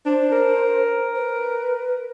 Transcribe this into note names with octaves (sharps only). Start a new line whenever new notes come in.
D4 C5
A#4
B4